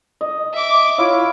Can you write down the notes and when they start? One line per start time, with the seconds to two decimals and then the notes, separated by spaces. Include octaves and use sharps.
0.21 D#5
0.53 E5 D6
0.98 E4 F4 C#5